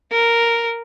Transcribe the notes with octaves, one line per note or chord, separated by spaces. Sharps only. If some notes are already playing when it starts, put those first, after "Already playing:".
A#4